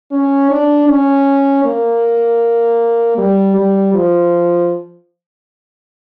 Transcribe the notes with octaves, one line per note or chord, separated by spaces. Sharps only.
C#4
D4
C#4
A#3
G3
G3
F3